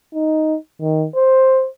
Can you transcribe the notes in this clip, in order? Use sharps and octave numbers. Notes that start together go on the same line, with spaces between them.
D#4
D#3
C5